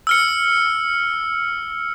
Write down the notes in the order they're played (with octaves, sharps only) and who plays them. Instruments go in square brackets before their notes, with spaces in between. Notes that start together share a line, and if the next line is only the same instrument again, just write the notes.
[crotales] E6 F6 C#7